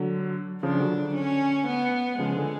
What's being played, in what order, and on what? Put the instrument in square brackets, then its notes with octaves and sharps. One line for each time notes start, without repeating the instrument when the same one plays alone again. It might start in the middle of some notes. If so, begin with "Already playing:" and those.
Already playing: [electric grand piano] D3 F#3
[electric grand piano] C#3 F3 [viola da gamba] D4
[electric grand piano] D3 F#3
D3
[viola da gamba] C#4
B3
[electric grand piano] C#3 F3 [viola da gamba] G#3
[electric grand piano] D3